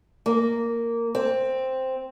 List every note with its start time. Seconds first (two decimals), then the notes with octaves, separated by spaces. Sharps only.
0.26 A#3
1.15 C4